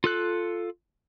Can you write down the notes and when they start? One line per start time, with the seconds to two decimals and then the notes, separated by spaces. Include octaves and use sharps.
0.04 F4 A4 F#6